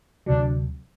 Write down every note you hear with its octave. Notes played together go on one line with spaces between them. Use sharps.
D2 C3 F#3 D4